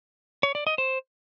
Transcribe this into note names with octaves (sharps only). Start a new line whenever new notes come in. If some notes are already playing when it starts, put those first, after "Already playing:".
C#5
D5
D#5
C5